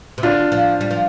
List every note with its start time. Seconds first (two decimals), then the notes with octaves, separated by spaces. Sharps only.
0.18 C3
0.23 D3 D4 F4
0.52 F3
0.81 G3
0.91 F3